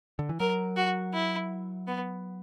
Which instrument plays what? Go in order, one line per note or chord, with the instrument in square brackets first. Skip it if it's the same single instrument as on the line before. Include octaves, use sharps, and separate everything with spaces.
[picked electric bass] D3
E3
[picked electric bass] F#3 [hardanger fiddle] A#4
[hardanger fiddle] F#4
E4
B3